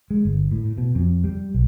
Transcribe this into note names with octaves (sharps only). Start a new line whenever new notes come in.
G#3
G1
A2
B2
F2
G3
B1